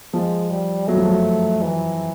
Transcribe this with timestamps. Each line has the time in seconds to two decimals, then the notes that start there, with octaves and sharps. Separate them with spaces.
0.13 F3 G#3
0.51 G3
0.87 F#3 A3
0.97 F3
1.04 F#3
1.62 E3